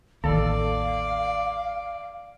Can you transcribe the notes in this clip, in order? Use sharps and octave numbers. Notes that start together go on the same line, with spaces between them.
A1 D#2 A4 D5 F5